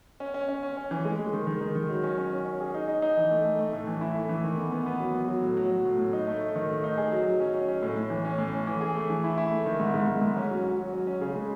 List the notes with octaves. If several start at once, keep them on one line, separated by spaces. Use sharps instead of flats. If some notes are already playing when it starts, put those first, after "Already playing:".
C#4
C#4
C#4
C#4
C#4
E3
G#3
G#3
D#3
D#3
D#3
D#3
F#3
C#4
C#4
C#4
C#4
G#4
D#4
D#4
D#4
E3
A3
A3
A3
A2
E3
E4
A3
E3
D#3
B3
B3
B3
F#3
B3
F#3
A2
F#3
F#3
A2
A2
D#4
A3
A3
D#3
A3
D#4
G#4
F#3
F#3
C#4
C#4
C#4
A2
A2
E3
C#4
A2
C#4
E3
G#4
A3
E3
E4
E4
A3
D#3
G#2
G#2
G#2
G#2
C#4
F#3
F#3
F#3
C#4
C#4
C#3
G#3